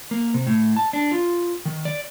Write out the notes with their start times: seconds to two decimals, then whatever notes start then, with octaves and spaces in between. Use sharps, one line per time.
0.11 A#3
0.34 C3
0.47 A2
0.76 A5
0.93 D4
1.11 F4
1.65 D#3
1.85 D5